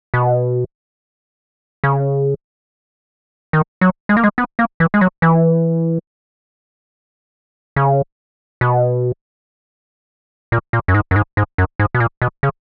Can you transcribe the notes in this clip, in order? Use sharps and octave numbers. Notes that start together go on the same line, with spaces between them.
B2
C#3
D#3
F#3
G#3
A#3
G#3
B3
A#3
E3
G#3
F#3
E3
C#3
B2
A#2
A#2
F#2
G#2
F#2
G#2
G#2
F#2
G#2
B2
A#2
B2
C#3